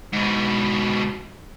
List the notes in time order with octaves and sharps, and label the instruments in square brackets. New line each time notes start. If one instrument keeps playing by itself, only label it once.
[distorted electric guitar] G#2 B2